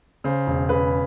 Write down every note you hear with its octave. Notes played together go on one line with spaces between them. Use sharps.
C#3 C5
E1
C#3 B4